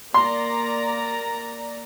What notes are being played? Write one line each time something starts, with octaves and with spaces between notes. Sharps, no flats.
A#3 D5 A#5 C6